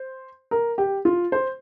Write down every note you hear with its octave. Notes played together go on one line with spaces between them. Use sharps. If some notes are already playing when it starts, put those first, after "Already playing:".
Already playing: C5
A#4
G4
F4
C5